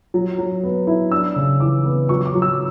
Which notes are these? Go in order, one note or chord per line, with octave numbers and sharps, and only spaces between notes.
F#3
F#3
B3
E4
D4 E6
C#3
E3 D6
B3
F#3 C#6
C#6
D6
F#3
E6